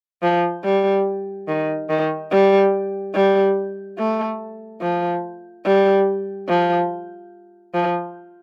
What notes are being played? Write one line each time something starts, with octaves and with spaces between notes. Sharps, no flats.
F3
G3
D#3
D#3
G3
G3
A3
F3
G3
F3
F3